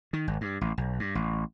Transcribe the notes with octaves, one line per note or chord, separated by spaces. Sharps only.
D#3
G#1
G2
A1
B1
G2
A1